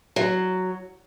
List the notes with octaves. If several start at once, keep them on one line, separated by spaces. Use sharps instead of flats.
F#3